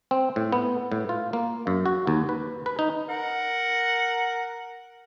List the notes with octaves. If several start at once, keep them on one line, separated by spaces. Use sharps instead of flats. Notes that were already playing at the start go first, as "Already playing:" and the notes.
C4
A2
B3
A2
F4
A#3
F#2
F#4
D#2
B4
B4
D#4
A#4 F#5